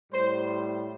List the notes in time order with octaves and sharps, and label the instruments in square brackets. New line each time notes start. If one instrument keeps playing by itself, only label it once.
[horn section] A2 G3 C5